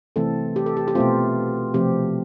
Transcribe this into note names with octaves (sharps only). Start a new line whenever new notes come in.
C3 E3 A3 C4 A4
G4
A4
G4
G4
B2 A3 C4 F4
C3 F3 A3 C4 G4